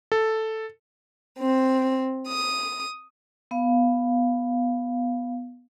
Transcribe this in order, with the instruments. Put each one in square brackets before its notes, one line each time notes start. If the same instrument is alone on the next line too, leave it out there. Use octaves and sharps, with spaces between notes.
[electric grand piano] A4
[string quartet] C4
D#6
[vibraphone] B3 F5